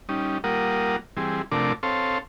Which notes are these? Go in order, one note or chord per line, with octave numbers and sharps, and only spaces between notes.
G3 C#4 D#4
G3 A#3 F4 A#4 F#5 D#6
E3 G3 C4 G#4
C3 F3 A3 D4 A#4 D5
C4 A4 C5 C#5 F5